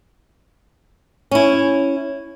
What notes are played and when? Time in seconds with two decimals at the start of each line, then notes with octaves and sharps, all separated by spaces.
1.31 C#4 E4